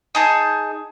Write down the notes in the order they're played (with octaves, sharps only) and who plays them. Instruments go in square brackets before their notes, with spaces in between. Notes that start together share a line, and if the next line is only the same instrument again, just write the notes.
[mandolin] D#4 G#4 A5